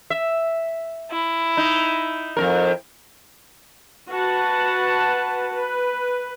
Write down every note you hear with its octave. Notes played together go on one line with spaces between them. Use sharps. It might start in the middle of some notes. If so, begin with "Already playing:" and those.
E5
E4
D#4
F2 C3 A#4
F#4 B4 F#5 A5
B4